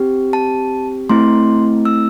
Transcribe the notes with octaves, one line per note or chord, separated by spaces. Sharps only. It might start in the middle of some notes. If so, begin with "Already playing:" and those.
Already playing: C4 G4
A5
A3 C4 E4 C6
E6